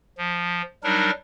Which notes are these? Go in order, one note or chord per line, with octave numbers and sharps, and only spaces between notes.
F3
F#3 G3 D4 D#4 A#4